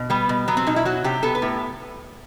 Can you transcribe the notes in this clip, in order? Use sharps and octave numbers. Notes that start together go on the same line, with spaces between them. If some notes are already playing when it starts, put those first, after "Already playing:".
Already playing: B2
G3 B3
B2
F#3 B3
C4
B2 D#4
E4
F#3 F#4
C3 G4
B3 A4
B4
A2